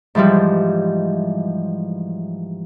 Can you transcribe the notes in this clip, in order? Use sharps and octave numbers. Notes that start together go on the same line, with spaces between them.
G#2 E3 F3 G3